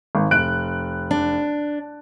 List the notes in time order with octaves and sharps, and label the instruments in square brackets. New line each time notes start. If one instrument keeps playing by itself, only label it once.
[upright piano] G#1
F1 F#6 D7
[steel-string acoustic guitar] D4